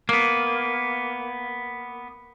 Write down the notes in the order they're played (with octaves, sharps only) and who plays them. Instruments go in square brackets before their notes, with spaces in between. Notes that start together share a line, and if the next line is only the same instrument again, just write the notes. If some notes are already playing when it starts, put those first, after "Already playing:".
[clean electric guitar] A#3 B3